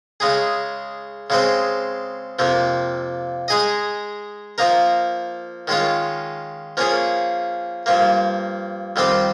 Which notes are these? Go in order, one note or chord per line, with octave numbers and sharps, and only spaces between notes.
C#3 G#3 D#4 G#4
C#3 G#3 C4
F2 C3 F3 A#3
G#3 D#4 G#4 D#5
F3 A#3 D#4 A#4
D#3 G#3 C#4 F4
F3 A#3 C#4 G#4
G2 F3 A#3
F2 D#3 G3 C4 G4